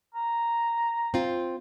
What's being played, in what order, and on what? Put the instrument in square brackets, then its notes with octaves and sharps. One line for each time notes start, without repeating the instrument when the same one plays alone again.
[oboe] A#5
[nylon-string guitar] C4 F4